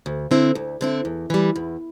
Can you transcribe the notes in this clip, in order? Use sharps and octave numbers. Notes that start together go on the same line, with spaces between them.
D2
D3 C4 E4
D2
D3 C4 E4
E2
E3 G3
E2